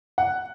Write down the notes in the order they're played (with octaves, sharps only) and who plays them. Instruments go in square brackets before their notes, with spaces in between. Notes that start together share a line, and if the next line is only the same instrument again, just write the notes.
[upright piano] F#5